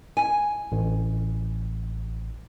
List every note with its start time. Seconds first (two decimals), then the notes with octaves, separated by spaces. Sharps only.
0.17 G#5
0.72 A1